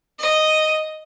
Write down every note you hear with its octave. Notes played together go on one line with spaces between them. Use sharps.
D#5